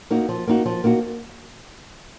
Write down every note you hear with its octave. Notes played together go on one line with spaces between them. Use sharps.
A#3 D#4 F#4
F3
A#3 D#4 F#4
F3
A#3 D#4 F#4